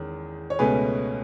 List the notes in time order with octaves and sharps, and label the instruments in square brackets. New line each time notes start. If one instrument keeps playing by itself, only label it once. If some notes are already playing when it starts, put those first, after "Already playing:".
Already playing: [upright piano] E2 D#3 G#3 C#4
C#5
C#2 B2 A3 C#4 G#4 B4